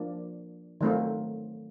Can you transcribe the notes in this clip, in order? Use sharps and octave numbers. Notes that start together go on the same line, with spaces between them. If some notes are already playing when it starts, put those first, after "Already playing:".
Already playing: F3 A#3 D4
D#3 F#3 A3 C4 F4